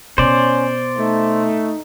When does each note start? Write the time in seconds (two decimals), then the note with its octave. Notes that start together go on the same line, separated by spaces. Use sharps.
0.18 B2 C#4 C5 D5
0.97 A3 D#4